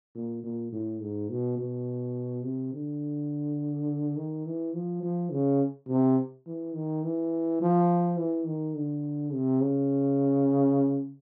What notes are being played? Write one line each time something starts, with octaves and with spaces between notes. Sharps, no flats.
A#2
A#2
A2
G#2
B2
B2
C3
D3
D#3
E3
F3
F3
C#3
C3
E3
D#3
E3
F3
E3
D#3
D3
C3
C#3